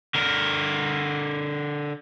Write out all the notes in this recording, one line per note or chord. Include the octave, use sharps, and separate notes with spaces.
D3 A#4